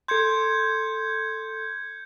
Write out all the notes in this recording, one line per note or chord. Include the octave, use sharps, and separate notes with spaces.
A4 C6 G6 G#6 C#7